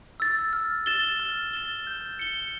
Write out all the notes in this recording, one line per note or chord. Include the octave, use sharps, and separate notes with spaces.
E6 A6
F6
A6 E7 G7
F6
A6 E7 G7
G6
C#7 G7